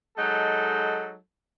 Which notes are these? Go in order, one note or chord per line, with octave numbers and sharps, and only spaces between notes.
F#3 G#3 D#4 A4